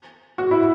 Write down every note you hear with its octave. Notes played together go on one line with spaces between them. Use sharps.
F#4
E4